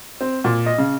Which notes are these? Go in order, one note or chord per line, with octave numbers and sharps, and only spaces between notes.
C4
A#2
D#5
C#3